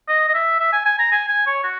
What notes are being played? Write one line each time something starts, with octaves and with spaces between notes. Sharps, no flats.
D#5
D#5
E5
E5
G#5
G#5
A#5
G#5
G#5
C#5
F#4